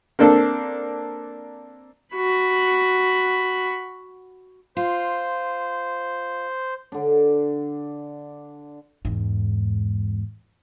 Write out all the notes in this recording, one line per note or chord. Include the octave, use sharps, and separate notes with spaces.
A#3 C4 D4 A4
F#4 B5
F4 C5
D3 D4
E2 G#2